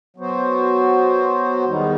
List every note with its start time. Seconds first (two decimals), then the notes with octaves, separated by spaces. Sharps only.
0.17 F#3 B3 F#4 C5
1.65 E2 D#3 G3 B3 D#4